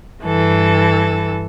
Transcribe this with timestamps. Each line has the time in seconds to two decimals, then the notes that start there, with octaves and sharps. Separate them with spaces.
0.23 G2 E3 A4